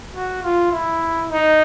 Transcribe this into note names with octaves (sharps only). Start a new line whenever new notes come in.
F#4
F4
E4
D#4